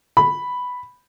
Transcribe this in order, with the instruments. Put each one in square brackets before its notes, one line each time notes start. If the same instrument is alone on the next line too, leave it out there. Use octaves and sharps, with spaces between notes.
[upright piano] B5